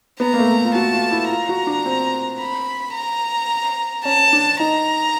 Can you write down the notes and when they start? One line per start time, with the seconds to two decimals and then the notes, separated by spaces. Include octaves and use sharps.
0.20 B3 A#5
0.34 A#3
0.39 A3
0.65 F4
0.75 F#4 A5
0.93 F4
1.11 E4
1.30 F4 A#5
1.49 F#4
1.67 D4
1.85 C4
2.40 B5
2.94 A#5
4.05 C#4 A5
4.33 D4
4.60 D#4 A#5